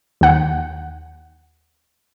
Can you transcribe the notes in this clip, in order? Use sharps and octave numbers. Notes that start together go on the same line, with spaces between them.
D#2 F#5